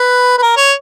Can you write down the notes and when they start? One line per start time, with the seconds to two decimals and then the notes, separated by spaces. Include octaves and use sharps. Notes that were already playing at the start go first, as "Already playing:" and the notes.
Already playing: B4
0.38 B4
0.42 A#4
0.57 C#5